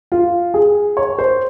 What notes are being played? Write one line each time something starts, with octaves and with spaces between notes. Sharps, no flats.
F4
G#4
C#5
C5